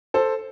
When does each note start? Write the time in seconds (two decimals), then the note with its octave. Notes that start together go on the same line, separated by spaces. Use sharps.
0.14 A4 C5